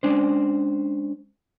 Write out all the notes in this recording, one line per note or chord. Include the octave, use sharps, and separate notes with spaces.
G#3 C#4 D4 C5